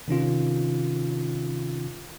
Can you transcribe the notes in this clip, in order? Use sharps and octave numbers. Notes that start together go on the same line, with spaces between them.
C3 D#3 C#4 F4